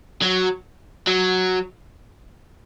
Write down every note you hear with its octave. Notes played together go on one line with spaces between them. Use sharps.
F#3
F#3